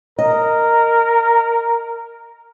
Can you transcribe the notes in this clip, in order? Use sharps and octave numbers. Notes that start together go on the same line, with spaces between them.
A#4 D#5